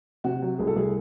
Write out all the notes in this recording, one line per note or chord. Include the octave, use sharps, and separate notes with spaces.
C3 F#4
F#3
C2 G#4
A4
C2 G#4